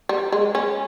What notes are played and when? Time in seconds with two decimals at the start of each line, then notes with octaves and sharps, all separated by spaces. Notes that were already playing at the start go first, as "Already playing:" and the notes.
0.09 G3
0.32 G#3
0.55 C#4